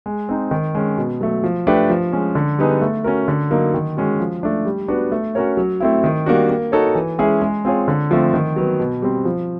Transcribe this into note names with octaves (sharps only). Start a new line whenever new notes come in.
G#3
C4 D#4
D#3
G#3 C#4
B2
F#3 A3
F3
A3 D4 G4 B4
F3
G#3 C#4
D3
G3 B3 D#4 G#4
A3
C#4 F#4 A#4
D3
F#3 A#3 D#4
D#3
G#3 C#4 F#4
F3
A3 D4
G3
B3 D4 F#4
A3
C#4 F#4 A#4 C#5
F#3
A3 C4 E4
D#3
G3 A#3 D4 F#4
A#3
D#4 F#4 A4 C#5
E3
G#3 C#4 E4 G#4
G#3
C4 F4 G#4 C#5
D3
F3 A3 C4
D#3
F#3 B3
B2
G3 C4
F3